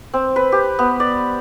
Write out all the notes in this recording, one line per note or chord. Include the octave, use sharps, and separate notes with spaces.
C4
B4
G4
B3
D5